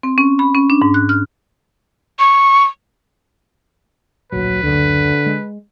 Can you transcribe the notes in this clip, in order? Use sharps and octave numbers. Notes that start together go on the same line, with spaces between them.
C4
C#4
B5
C#4
D4
G#2
F#6
F6
C#6
D1 A#1 F#3 B4
F#1 D2 D3
G#3